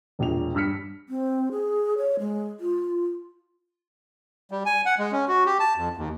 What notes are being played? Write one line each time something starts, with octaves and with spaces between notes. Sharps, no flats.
E1 A#1 A#2 F7
G2 G3 E6 F6 B6 C#7
C4
G#4
C#5
G#3
F4
G3
G#5
F#5
G#3
C#4
F#4
G4
A5
F2
D#2